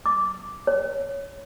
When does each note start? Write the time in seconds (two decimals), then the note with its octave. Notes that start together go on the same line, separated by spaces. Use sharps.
0.06 D6
0.67 C#5